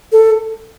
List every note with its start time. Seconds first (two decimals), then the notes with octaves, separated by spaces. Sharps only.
0.12 A4